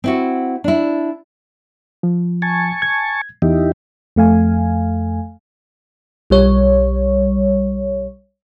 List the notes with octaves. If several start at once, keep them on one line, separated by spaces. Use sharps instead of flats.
C4 E4 F#4
D4 E4
F3
G#5 A5 C#6
G#6
E2 D#4 E4 G4
F2 A3 F5 G#5
B1 G3 C#5